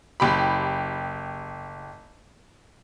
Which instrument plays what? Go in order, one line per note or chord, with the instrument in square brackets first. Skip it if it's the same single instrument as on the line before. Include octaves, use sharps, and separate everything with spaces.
[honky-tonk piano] F#1 G4 B5